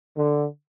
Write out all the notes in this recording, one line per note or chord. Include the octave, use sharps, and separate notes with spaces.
D3